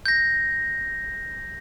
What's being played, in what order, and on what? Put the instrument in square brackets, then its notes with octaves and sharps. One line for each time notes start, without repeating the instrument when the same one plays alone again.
[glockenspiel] G6 A#6